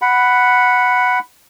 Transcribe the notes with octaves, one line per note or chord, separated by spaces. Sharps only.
F#5 B5